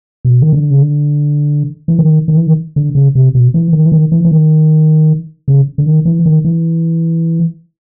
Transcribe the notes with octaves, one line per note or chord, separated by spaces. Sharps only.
B2
D#3
D3
C#3
D3
E3
D#3
D#3
E3
D#3
D3
C#3
C3
B2
E3
D#3
E3
D#3
E3
E3
D#3
C#3
D3
D#3
E3
D#3
E3